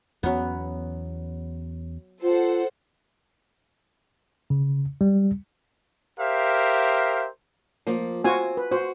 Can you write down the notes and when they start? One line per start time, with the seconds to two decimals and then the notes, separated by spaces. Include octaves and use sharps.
0.23 E2 F#3 B3 C#4
2.22 F4 A4 C5 F#5
4.50 C#3
5.01 G3
6.19 G4 A#4 C5 E5 F5
7.87 F3 A#3
8.24 C4 F4 F#4 G#5
8.57 B4
8.71 F#4 C5